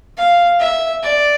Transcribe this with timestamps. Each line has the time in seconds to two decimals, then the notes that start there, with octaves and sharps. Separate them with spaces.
0.17 F5
0.60 E5
1.03 D5